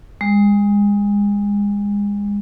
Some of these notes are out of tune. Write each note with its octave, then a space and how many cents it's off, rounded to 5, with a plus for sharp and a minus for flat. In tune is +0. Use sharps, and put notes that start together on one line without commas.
G#3 -30